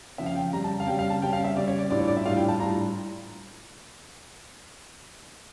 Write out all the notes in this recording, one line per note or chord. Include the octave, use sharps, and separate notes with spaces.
C#3 F3 C#4 E5
F5
G5
C#3 G3 C#4 A#5
A5
F5
C#3 G3 C#4 G5
F5
A5
C#3 G3 C#4 G5
F5
E5
C#3 G3 C#4 D5
C#5
D5
A2 G3 D4 F4 D5
C#5
D5
E5
A2 G3 D4 F4 F5
G5
A5
A2 G3 D4 F4 A#5